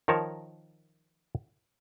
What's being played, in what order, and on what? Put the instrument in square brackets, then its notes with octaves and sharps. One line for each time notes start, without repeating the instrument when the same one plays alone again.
[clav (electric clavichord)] D#3 F3 A#4 C#5 A5